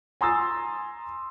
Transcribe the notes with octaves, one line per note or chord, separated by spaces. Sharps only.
G#5 A#5 C6 D#6 E6 A6